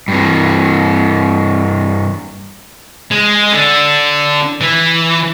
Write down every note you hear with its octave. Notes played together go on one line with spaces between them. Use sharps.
G2 E3
G#3
D3
E3